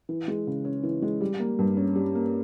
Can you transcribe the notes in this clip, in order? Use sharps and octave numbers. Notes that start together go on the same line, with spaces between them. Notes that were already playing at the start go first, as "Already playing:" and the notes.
E3
G#3
C#3
C#4
E3
G#3
G3
A#3
G2
C#4
G3
A#3